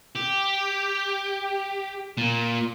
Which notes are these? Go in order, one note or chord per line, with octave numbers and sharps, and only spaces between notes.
G4
A#2